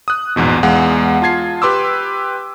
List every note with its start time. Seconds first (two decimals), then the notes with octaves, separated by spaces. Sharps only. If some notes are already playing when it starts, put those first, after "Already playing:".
0.08 D#6 F#6
0.36 A#1 E2 G#2 B2
0.63 E2 G#3 F5 F#5
1.22 F4 A5 G#6 C7
1.62 G4 B4 C6 D6 E6